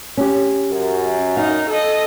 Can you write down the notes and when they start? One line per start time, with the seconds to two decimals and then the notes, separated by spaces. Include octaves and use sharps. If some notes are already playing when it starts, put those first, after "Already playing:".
0.17 C#4 G4
0.71 F#2
1.37 D#4 F5
1.69 A4 D#5